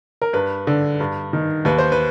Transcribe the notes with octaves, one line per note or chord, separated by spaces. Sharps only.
A#4
G2 B4
D3
G2
D#3
D#2 B4
C5
B4